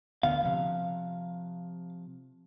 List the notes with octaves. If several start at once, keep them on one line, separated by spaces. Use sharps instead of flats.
D2 D3 B3 F5
C3 F3